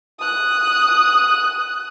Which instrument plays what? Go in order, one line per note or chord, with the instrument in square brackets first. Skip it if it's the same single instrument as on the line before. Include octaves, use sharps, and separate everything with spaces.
[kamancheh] D#6 F#6